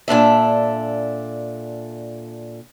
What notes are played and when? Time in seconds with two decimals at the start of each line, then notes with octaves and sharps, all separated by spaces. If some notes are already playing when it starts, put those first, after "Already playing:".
0.08 A#2 D4 A4 E5